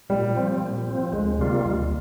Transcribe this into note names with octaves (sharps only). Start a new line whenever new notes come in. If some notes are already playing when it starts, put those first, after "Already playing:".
A#2 G3
F3 C4
A#2
F3 C4
D2 G#3
C3 G3 A#3 F4
D2